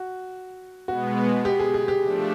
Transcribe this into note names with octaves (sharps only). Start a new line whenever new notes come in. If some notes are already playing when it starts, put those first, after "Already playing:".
Already playing: F#4
B2 G#3 B3 F#4
G4
G#4
G#4
G4
F3 A3 D4